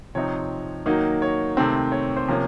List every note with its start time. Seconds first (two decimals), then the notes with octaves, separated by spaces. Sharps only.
0.15 C3 F3 C4 D#4 C#5
0.86 D#3 F#3 A#3 D#4
1.22 C#5
1.57 C3 D#3 A3 C4
1.92 C#5
2.17 C5
2.28 C3 F3 A#3 C#4